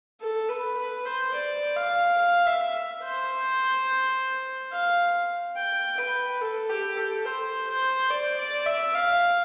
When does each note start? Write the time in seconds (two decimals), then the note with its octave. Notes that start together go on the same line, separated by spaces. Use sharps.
0.21 A4
0.49 B4
0.78 B4
1.06 C5
1.34 D5
1.76 F5
2.18 F5
2.46 E5
3.03 C5
4.72 F5
5.56 G5
5.98 B4
6.41 A4
6.69 G4
6.97 A4
7.25 C5
7.67 C5
8.10 D5
8.38 D5
8.66 E5
8.95 F5